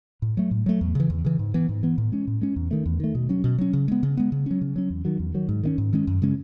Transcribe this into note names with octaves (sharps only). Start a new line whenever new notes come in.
A2
F#3 A3
A2
F#3 A3
E2
C#3 E3
E2
C#3 E3
G#2
E3 B3
G#2
E3 B3
A2
G#3 C#4
A2
G#3 C#4
E2
D#3 A3
E2
D#3 A3
B2
F#3 C#4
B2
F#3 C#4
C#3
G#3 B3
C#3
G#3 B3
C#3
F#3 C#4
C#3
F#3 C#4
E2
D#3 F#3
E2
D#3 F#3
G#2
D#3 G#3 C#4
G#2
D#3 G#3 C#4
F#2
C#3 G#3 C#4